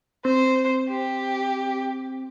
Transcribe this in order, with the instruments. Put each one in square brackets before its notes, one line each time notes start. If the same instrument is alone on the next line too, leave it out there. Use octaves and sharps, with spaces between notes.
[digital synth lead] C4 [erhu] C5
[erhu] G4